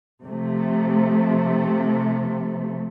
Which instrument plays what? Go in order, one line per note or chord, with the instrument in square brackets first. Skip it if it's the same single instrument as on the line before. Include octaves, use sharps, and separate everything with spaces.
[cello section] C3 F3 A3